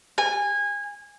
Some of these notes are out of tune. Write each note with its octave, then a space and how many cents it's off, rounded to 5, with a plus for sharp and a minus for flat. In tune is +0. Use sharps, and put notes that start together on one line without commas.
G#5 -25